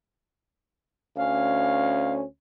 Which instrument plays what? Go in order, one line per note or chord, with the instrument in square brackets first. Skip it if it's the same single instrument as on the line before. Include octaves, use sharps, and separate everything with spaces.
[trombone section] D2 C#4 [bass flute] F5